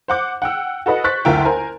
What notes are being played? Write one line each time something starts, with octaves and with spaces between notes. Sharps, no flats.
C5 F#5 D6 G6
F#5 G5 E6
F#4 A4 B4 D#5 F#5
C5 C#6 F#6 A6 B6
F#1 D2 F4 A#4 E5 G5
A#4 C5 G#5